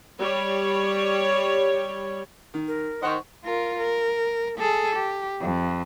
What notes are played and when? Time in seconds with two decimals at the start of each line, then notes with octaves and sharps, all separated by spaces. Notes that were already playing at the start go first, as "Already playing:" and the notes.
0.18 G3 C#5
2.54 D#3
2.67 A#4
3.03 D#3 C5 F#5 C#6
3.45 F4 A#4
3.78 A#4
4.58 G#4 A4
4.95 G4
5.40 F2